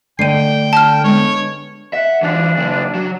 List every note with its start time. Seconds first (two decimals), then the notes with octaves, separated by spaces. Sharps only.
0.19 D3 A3 D5 D#5 G5 C7 D#7
0.73 A5 F6
1.04 G#3 B3 D4 C#5
1.93 E5 F#5
2.22 E3 D4 F4
2.56 C#3 F#3
2.95 F#3